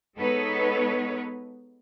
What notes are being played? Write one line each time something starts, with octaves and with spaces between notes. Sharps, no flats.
G#3 B3 D#4 A4 B4 C#5